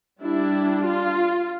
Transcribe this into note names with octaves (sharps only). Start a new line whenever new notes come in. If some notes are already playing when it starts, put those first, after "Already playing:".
G3 D4 E4
F4